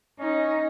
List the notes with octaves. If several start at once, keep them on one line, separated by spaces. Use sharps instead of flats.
C#4 D#4